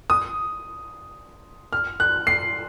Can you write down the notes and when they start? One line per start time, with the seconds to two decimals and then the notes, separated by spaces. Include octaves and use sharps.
0.10 D#6
1.73 F6
2.00 F#6
2.27 C7